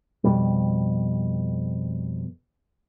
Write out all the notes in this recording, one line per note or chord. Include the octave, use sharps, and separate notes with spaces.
F2 B2 G3